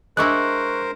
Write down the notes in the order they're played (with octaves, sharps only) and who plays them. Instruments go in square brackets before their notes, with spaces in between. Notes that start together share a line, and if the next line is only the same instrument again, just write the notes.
[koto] G#3 D4 E4 [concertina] A#4 C5 [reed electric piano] C#6 F#6